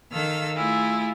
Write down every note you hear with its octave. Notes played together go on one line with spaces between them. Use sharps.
D#3 A4 D#5 F5 E6 F6
A3 E4 F4 G#4